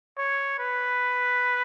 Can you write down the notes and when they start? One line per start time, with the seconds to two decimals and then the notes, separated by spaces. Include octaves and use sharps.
0.17 C#5
0.58 B4